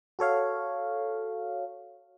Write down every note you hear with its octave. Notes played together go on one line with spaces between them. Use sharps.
F#4 A4 C#5 F5